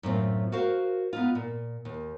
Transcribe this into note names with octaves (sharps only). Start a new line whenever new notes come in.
F#2 A2 C4 F4
F#4 A#4 C5 F5
B3 D#4 F4
A#2
D#2